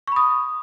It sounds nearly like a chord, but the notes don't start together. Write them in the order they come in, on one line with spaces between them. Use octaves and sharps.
C#6 B5 D#6